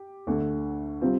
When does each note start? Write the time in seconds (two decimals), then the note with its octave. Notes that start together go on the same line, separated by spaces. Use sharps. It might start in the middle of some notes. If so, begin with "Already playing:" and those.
Already playing: G4
0.27 D2 D3 A3
1.02 C3 G3 C4 F4